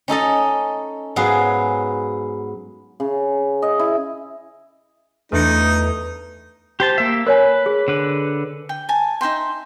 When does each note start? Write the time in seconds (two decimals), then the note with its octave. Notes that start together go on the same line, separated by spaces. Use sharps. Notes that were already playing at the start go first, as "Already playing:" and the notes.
0.08 C#4 D#4 A4 D#5
1.16 G#2 F#3 B3 G#4 F5
3.00 C#3
3.62 D#5
3.79 E4
5.32 E2 A3 D4 D#4 C#7
6.80 G4 C5 A5
6.98 A#3 E5
7.27 A#4 B4 C#5 G#5
7.66 G#4
7.88 D3 B4
8.69 G5
8.89 G#5 A5
9.21 D#4 E5 G5 C6